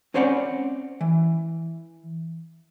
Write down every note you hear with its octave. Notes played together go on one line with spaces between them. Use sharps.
C4 C#4 C5 D5 F#5
E3